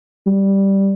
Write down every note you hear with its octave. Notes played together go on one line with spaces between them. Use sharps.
G3